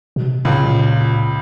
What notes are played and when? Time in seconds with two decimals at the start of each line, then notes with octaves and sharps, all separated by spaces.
0.16 B2
0.26 C3
0.45 C#2 A#2 C#3
0.64 A#2